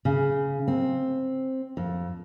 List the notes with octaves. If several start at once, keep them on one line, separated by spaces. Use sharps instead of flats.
C#3
C4
F2